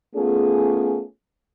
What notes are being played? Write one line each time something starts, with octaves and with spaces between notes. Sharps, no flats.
A3 B3 C#4 F4 G#4